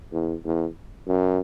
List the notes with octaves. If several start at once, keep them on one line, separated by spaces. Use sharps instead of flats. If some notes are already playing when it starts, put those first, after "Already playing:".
E2
E2
F#2